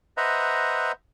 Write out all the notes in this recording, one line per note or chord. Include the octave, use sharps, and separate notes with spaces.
B4 C5 D#5 E5 F#5 A#5